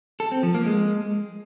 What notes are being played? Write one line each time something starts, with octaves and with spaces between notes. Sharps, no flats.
A4
C4
F3
A#3
G#3